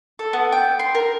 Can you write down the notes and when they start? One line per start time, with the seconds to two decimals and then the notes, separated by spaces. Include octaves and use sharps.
0.19 A4
0.33 B3
0.52 G5
0.79 C6
0.95 A#4